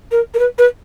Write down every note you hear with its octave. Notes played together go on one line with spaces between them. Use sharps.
A#4
A#4
B4
B4